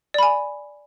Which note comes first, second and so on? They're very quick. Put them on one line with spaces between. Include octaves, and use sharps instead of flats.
D5 B5 G#5